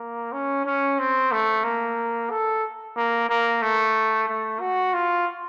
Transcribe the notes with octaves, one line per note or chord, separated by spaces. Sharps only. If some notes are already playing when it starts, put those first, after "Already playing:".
Already playing: A#3
C#4
C#4
C4
A3
A#3
A4
A#3
A#3
A3
A3
F#4
F4